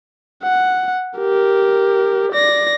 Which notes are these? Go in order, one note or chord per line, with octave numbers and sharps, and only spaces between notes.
F#5
G4 A#4
D5 A#6